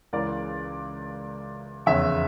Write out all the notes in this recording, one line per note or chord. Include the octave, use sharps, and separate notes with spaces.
C#2 C#3 E3 A#4 D5
F1 E2 C#3 C#5 E5